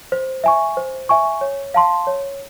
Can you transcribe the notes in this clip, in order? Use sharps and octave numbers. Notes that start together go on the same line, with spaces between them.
C5
E5 G#5 C#6
C5
E5 G#5 C#6
C#5
F5 A5 C6
C#5